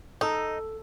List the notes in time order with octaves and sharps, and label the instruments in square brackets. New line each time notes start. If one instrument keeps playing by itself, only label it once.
[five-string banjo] D#4 [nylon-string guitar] A4